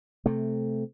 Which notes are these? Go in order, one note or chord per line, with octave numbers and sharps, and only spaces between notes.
C3 A3